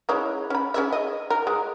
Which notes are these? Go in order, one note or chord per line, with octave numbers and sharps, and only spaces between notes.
G#3 C#4 E4
C#4 B5
C#4 G#4 E5
D#5
A#4
G#3